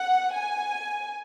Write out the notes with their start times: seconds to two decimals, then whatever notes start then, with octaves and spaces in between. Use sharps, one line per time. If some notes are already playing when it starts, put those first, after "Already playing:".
Already playing: F#5
0.35 G#5